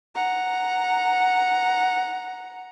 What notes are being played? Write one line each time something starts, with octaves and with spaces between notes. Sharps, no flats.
F#5 A#5